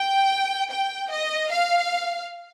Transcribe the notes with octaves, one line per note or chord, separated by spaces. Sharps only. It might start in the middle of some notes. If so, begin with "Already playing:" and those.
Already playing: G5
G5
D#5
F5